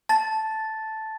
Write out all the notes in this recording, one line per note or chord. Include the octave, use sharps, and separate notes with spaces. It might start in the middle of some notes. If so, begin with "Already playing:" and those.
A5 A6